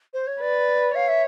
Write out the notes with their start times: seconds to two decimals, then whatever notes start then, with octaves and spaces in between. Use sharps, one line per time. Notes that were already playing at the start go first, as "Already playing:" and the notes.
0.13 C5
0.27 C#5
0.41 B4 D5
0.95 C#5 F5
1.08 E5